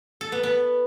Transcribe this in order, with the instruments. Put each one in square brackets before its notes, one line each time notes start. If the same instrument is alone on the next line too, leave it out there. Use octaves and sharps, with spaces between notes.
[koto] A4
B3
B3